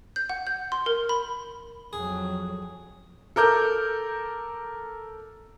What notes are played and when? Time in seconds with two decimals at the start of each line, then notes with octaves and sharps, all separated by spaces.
0.16 G6
0.29 F#5
0.47 G6
0.72 C6
0.86 A#4
1.09 B5
1.93 F2 F#3 G#4
3.36 A4 A#4 D6 G6